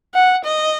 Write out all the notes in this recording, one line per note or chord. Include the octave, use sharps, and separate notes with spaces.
F#5
D#5